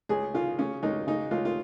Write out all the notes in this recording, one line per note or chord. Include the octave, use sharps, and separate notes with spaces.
C#2 G#4
C#3 F4
C#3 C#4
C#2 D#4
C#3 D#4
C#2 F4
F4